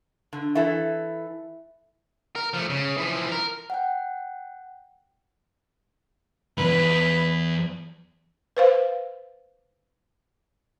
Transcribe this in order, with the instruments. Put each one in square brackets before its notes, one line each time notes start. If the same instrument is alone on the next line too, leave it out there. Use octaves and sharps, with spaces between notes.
[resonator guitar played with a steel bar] D3
[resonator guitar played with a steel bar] E3 E4 A4 [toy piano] E5
[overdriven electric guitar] A#4
F3 A3
C#3
E3 F3
A#4
[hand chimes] F#5 G5
[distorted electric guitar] E2 G2 [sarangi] B4
[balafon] B4 C5 F5